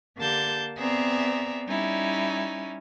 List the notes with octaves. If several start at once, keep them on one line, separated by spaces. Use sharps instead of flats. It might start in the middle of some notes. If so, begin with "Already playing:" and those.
D3 A#3 G4 A5 G6
B3 C4 G#4 D5 E5 A#5
G3 C#4 D#4 E4